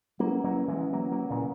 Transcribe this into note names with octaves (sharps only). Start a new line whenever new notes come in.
F#3 A#3 C#4 E4 B4 F#5
F#3 A#3
E3 G#3
F#3 A#3
F#3 A#3
A#2 C#3